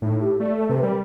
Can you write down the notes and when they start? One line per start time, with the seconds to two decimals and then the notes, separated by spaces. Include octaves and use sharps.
0.02 A2 D#4
0.20 G4
0.40 A3 D5
0.57 A4
0.69 C3 B4
0.83 G3 A#4